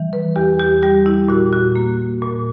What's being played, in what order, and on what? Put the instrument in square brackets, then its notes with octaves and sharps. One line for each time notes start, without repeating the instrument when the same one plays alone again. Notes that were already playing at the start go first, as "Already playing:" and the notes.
Already playing: [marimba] E3 G3
B4
E2 G4
G4
G3 G4
E4
A#2 F#4
F#4
A#3
A#2